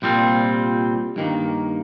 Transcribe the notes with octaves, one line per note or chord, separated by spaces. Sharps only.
C2 A#2 G3 C4 F4
G2 D#3 A#3